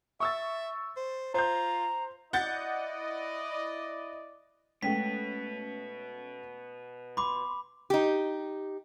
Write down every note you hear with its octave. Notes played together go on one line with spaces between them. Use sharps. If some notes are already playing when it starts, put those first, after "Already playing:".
E5 C#6 E6 A6
C5
F4 C5 A#5 G6
E4 D5 D#5 F#5 G6 A6
B2 G#3 A3 B3 C#4 G5 B6
B5 C6 D6
D#4 G4